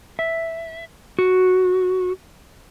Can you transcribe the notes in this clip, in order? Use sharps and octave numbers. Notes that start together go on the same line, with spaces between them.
E5
F#4